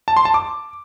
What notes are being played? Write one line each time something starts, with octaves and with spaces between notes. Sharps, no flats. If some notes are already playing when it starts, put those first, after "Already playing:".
A5
C6
A5
D6